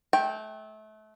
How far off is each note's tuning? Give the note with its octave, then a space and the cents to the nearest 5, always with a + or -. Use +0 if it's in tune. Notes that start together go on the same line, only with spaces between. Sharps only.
A3 -30 G5 +0